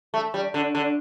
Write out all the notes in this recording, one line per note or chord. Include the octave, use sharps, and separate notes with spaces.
A3
G3
D3
D3